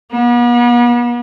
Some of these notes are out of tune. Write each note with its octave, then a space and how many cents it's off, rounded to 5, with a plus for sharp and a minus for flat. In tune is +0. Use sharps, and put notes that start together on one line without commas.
B3 -45